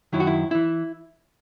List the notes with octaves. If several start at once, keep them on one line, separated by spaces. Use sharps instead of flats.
F#2 D#3 F#3 E4
F#4
E4
E3 E4